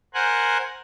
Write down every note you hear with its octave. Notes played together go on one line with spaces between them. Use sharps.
A#4 C5 F#5 G#5 F#6